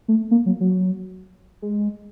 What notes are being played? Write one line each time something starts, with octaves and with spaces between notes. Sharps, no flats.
A3
A#3
F#3
F#3
G#3